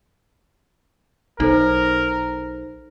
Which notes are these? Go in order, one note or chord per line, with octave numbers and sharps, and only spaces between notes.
B1 D#4 A4 A#4 C5